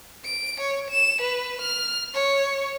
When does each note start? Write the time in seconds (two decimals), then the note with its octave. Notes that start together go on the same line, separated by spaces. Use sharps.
0.25 D7
0.60 C#5
0.91 E7
1.22 B4
1.61 F6
2.14 C#5